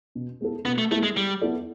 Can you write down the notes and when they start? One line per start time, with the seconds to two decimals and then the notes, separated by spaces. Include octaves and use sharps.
0.15 B2
0.41 G#3 B3 E4 A4
0.65 B2 B3
0.78 A3
0.91 G#3 A3 B3 E4 A4
1.03 G#3
1.15 G3 G#3
1.41 B3 E4 A4 D5